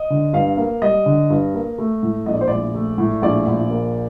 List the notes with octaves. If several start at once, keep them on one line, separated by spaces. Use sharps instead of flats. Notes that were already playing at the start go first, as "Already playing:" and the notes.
Already playing: D#5
D3
G2 F5
A#3
G3 D#5
D3
G2
A#3
A3
A2
A#1 D#5
D5
C5
A#1 D5
A3
A2
A#1 D5
A#1
A#3